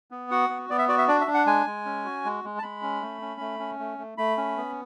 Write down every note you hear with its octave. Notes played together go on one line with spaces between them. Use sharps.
B3
F#4 F#5
B3
B3 D5
E5
F#4 D5
E5
D4 D5
E5
D4
F#5
G#3 G#5
G#3
C#4
F#4
G#3
G#3
A5
G#3 B5
C#4
A3
C#4
A3
C#4
A3
A3
A3 B5
C#4
B3